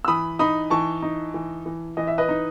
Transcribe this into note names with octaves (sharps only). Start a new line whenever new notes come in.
E6
E3 B5 D#6
D#4 B5 D#6
E3 A5 C#6
D#4
E3
E3
E3 D#5
E5
B4 D#5
D#4